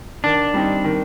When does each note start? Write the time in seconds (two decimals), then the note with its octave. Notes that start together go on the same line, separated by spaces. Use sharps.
0.24 D#3 D4
0.54 G3 C4 D#4
0.84 D#3